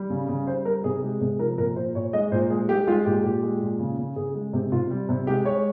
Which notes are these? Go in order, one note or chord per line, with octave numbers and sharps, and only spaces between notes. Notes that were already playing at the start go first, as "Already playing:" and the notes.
Already playing: G3
C#3
C#3
G3 C5
G3 A#4
C3 G#4
G#3 G4
C3 G#4
F3 A#4
A#2 A#4
A#2 C5
A#2 C#5
G#3 D#5
A#2 C5
G#3 G#4
G#3 G4
G#3 F4
A#2 G4
A#2 G4
G#3
A#2
C#3
C#3
C#3 G#4
G#3
C3 G4
C3 F4
G3
C3
G#3 G4
G#3 C#5